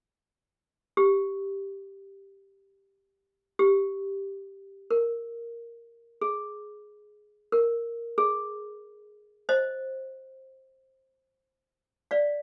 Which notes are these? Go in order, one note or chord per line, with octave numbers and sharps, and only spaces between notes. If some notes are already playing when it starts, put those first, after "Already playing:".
G4
G4
A#4
G#4
A#4
G#4
C5 D#5
D5 F5